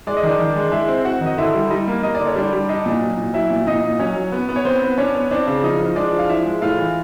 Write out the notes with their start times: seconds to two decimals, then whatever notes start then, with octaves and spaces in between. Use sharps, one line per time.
0.07 G#3 D5
0.17 D#5
0.23 D#3 D4 D5
0.39 D#3
0.56 G#3
0.72 G#3 E4 E5
0.88 C4
1.05 C4 F#4 F#5
1.21 D#3
1.26 D#5
1.38 D3 E4 E5
1.55 G3
1.70 G3 D#4 D#5
1.87 A#3
2.03 A#3 D#5
2.15 D5
2.20 D3
2.27 C#5
2.36 G3 D4 D5
2.53 G3
2.69 D4 D#4 D#5
2.86 A#2
3.02 F#3
3.17 A#2
3.34 F#3 E4 E5
3.50 A#2
3.66 A#2 D#4 D#5
3.84 A#2
3.99 F#3 C#4 C#5
4.16 F#3
4.32 B3
4.49 B3
4.56 C#5
4.65 B3 C4 C5
4.82 B3
4.98 C#4 D4 C#5
5.15 B3
5.31 C4 D4 D5
5.47 C#3
5.63 F3 D#4 D#5
5.80 F3
5.96 G#3 D4 D5
6.12 F3
6.19 F5
6.29 F3 E4 E5
6.46 G#3
6.62 A2 F4 F5
6.78 E3